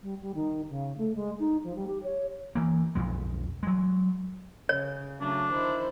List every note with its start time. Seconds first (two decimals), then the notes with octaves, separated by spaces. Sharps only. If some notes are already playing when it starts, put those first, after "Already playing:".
0.02 G3
0.21 G3
0.34 D#3
0.69 C#3
0.97 A3
1.15 G#3
1.39 D#4
1.63 F3
1.75 G3
1.87 G4
2.03 C#5
2.55 E3 A#3
2.95 B1 F2 G#3
3.63 F#3 G#3
4.69 C#3 C#5
5.21 C#3 F#3 A3 D4
5.53 D#3 E4 C5